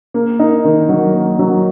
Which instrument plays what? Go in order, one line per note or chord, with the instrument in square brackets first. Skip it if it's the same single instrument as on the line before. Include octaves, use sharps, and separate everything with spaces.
[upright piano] A#3
D#4
D#3
F#3
A#3
F#3